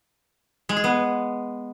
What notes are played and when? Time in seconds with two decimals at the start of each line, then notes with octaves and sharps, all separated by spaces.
0.69 G#3
0.77 G#4
0.84 B3